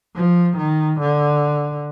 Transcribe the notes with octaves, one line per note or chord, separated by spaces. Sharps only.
F3
D#3
D3